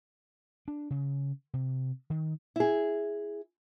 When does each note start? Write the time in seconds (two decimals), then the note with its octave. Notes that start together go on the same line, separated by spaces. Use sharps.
0.68 D4
0.90 C#3
1.54 C3
2.10 D#3
2.56 E4 G#4